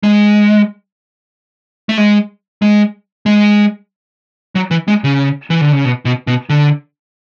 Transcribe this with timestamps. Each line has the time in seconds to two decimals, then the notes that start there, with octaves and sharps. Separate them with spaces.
0.03 G#3
1.89 A3
1.98 G#3
2.62 G#3
3.26 G#3
4.55 F#3
4.71 E3
4.88 G#3
5.04 C#3
5.50 E3
5.61 D3
5.72 C#3
5.85 B2
6.05 B2
6.27 B2
6.50 D3